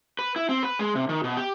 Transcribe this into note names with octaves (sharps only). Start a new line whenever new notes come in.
B4
E4
C4
B4
G#3
C3
D#3
B2
G4